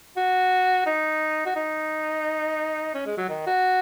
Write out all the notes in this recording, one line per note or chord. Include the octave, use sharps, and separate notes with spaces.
F#4
D#4
F#4
D#4
C#4
G#3
F#3
D#3
F#4